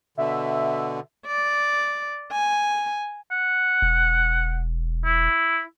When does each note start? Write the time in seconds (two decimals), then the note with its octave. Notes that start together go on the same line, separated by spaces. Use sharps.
0.18 B2 D3 E5
1.27 D5
2.32 G#5
3.32 F#5
3.82 E1
5.05 E4